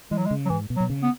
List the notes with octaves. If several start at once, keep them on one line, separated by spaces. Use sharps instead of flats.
E3 G#3
F#3
G#3
C#3
F#3
G#2 E3
B2
F#3
B2
C#3
B3